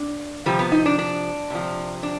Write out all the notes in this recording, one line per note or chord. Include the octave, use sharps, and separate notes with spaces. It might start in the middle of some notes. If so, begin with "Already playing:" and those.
Already playing: D4
C3 F3 G3
B3
D#4
D4
D4
C3 F3
D4